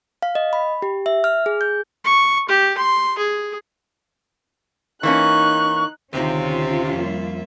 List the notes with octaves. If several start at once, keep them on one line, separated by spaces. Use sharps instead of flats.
F5
D#5
B5
G4
E5
F6
G#4
G6
C#6
G4
C6
G#4
E3 A#3 C#4 D#4 C#6 F#6
D2 C3 D#3 C4 C#4 D#4 F4
F2 G3 A#3 E5